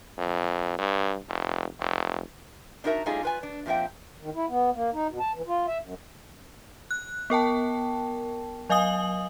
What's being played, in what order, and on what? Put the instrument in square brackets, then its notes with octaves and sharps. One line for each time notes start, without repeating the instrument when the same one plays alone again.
[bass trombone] F2
G2
F1
F1
[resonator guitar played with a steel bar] D4 D#4 F#4 A#4 E5 A5
G3 A3 C#4 D#4 F4 G#4
F4 B4 G#5
D4
A#2 F3 C4 E5 G5
[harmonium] D#3
E4
B3
A#3
D#4
B2
A5
E3
F4
E5
F#2
[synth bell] F#6
B3 A#4 G5 A5
F#3 D#5 F5 G#5 D#6 F#7